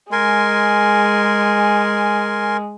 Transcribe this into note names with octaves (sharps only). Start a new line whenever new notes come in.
G#3 A#4 G#5 C6